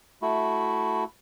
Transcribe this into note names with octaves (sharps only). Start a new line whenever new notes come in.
A3 E4 F#4